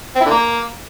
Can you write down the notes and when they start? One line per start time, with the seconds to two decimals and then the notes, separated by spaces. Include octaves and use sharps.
0.15 C4
0.21 E4
0.26 D3
0.31 A#3